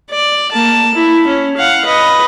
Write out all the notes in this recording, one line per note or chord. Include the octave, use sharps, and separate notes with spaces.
D5
A#3 A5
E4
C#4
F5 F#5
B4 D#5